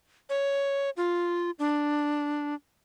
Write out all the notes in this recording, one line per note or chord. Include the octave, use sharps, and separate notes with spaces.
C#5
F4
D4